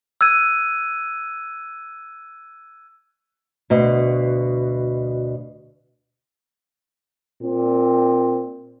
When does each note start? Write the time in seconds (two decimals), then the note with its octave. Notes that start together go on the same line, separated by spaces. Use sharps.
0.21 E6 F#6 G#6 D#7
3.70 D2 B2
7.41 A#2 C4